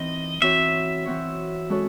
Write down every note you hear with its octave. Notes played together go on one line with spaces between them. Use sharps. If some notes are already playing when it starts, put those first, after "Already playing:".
Already playing: E3 C4 D#4 D#5
E3 C4 F#4 C#5 E5
E3 C4 F#4 C#5
G#3 C#4 F#4 A4 C#5